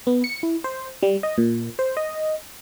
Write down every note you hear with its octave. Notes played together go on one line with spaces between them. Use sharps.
B3
C#7
E4
C5
G3
D#5
A#2
C5
D#5